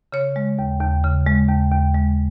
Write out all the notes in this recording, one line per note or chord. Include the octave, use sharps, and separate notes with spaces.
C#3 C#5
G#3
D#2
D#2
C#3
G#3
D#2
D#2
G#3